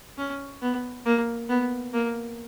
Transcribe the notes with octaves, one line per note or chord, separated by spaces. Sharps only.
C#4
B3
A#3
B3
A#3